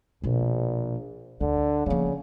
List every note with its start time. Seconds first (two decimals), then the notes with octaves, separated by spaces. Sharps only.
0.23 A#1 B2 F4
1.40 D2 D3
1.86 C#3 F3 A#3